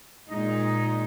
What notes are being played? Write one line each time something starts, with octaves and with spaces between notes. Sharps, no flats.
A#2 G#3 D#4